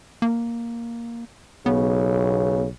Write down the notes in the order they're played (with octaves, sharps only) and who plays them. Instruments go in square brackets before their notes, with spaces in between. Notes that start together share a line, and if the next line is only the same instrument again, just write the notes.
[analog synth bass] A#3
[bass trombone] B1 [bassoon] C#3 [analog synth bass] B3